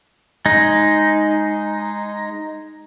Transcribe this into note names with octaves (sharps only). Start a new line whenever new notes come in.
G#3 D#4